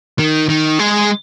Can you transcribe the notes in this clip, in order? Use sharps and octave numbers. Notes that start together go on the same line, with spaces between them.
D#3
D#3
G#3